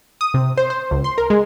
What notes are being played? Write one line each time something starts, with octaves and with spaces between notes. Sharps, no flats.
D#6
C3
C5
C5
C#2
C6
A#4
G#3